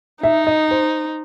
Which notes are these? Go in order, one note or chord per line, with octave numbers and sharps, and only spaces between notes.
D#4 E5
D#5
C5